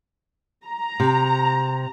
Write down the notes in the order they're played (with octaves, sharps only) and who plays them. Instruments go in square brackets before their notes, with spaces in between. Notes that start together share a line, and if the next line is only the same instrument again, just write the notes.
[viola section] A#5
[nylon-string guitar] C3